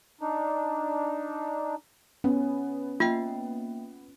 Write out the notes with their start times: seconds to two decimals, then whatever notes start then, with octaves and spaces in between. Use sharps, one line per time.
0.21 D4 D#4
2.24 B3 C#4
3.00 A#3 F4 E5 G5